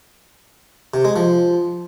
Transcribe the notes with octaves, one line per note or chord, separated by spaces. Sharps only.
C3
G#3
F3